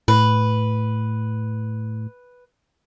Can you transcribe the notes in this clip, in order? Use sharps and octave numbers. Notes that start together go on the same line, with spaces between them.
A2 B4